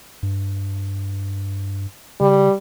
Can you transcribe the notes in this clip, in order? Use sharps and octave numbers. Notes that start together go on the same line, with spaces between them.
G2
C#3 G3